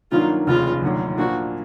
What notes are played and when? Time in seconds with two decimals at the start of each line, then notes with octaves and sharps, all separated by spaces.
0.11 G2 D#3 F#3 A#3 D4 F4
0.47 F1 D#2 C#3 F4
0.82 F1 D#2 D3 F#3
1.17 A#2 F3 A#3 D4 F#4